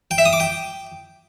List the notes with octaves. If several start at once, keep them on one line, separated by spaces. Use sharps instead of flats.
G5
E5
D#6
D6
G5